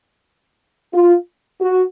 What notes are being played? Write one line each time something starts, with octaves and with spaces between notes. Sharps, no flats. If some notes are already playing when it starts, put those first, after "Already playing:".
F4
F#4